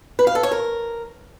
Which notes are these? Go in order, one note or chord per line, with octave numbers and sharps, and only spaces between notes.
B4
F5
A4
C#5
A#4